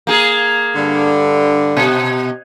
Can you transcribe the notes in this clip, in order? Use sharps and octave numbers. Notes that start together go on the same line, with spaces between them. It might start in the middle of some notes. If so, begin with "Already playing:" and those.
A#3 G#4
G2 D3
B2